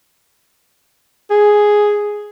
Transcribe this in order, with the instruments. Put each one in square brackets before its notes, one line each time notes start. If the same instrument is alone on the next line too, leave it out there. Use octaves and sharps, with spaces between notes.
[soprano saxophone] G#4